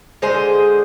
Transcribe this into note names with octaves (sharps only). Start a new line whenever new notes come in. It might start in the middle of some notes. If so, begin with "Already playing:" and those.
D3 G#3 G#4 C5